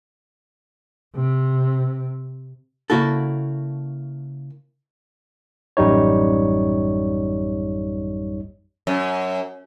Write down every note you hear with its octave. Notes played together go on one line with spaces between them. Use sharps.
C3
C#3 A#3 E4 F#4 A4
A1 F#2 G3 D#4 C#5
F#2